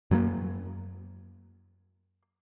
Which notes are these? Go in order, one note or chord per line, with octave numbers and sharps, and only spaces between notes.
F#2 F#3 G3 A#3